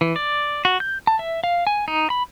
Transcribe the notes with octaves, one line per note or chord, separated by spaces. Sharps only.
E3
D5
F#4
G6
A5
E5
F5
G#5
D#4
B5